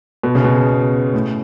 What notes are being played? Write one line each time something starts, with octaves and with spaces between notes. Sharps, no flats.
B2
C#3
B2
A2